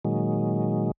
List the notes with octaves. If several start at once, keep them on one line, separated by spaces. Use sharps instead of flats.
A#2 D#3 F#3 G#3